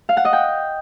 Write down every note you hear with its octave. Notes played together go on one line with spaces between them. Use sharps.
F5
F#5
D#5
G5